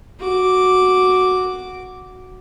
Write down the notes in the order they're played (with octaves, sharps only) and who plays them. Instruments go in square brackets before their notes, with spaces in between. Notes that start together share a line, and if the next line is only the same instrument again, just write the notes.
[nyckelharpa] F#4 D6